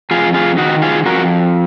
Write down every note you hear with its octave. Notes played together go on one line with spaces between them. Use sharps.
F2 F4 G#4
F4 G#4
D#3 D#4 F#4
F4 G#4
F2 F#4 A#4